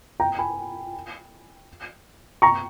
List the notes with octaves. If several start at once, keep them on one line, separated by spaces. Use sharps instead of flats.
G5 A#5
G#5 B5
A#5 C#6